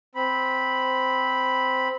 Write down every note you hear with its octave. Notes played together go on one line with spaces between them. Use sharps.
C4 B5